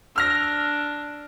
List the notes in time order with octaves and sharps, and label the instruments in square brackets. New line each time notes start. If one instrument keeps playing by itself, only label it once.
[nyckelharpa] D4 [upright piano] E6 F6 A#6